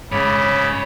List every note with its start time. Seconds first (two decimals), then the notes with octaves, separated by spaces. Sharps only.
0.12 G#2 C#3 C#5 D5 B5